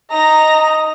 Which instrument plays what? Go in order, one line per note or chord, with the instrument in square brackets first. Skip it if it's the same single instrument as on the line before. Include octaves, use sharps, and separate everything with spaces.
[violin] D#4 A#6 [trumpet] D#5 [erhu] A#5